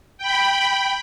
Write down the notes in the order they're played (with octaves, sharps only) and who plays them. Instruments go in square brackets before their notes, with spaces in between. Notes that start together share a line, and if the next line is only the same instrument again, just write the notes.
[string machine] G5 B5